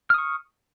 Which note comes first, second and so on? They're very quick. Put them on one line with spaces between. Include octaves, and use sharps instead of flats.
F6 D#6 C#6